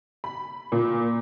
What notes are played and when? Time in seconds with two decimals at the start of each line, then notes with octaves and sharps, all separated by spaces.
0.24 B5
0.72 A#2